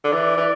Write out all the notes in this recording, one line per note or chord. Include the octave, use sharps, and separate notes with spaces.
D3
E3 D5
E3